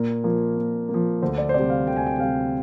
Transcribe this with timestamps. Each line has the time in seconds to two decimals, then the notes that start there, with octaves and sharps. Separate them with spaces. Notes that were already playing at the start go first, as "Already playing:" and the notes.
Already playing: A#2 A#4
0.24 F3 A#3
0.57 A#2
0.89 A#3
0.94 F3
1.22 D2 C5
1.38 D5
1.49 C5
1.54 C3 G3 D5
1.70 F5
1.86 D2 G5
1.96 G#5
2.06 G5
2.19 C3 G3 F5